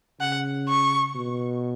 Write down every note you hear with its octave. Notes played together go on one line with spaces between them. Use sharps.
C#3 F#5
C#6
B2